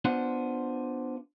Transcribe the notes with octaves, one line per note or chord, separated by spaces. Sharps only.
B3 D4 F4 C5 F#5